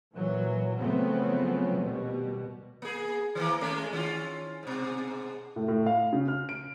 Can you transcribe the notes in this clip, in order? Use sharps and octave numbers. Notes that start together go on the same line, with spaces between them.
A#2 E3 F#3
C#3 F3 F#3 A3 B3 C4
D#2 B2 G3
A#3 G#4
D#3 E3 A#3
G#3 A3 C#4
D#3 C#4 F4
G#2 B2
A2
A2
F5
C#3
F6
D7